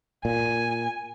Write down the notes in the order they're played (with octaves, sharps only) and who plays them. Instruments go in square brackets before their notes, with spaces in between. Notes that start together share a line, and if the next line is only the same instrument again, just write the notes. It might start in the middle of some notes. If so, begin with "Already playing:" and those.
[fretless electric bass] A#2 [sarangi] G#5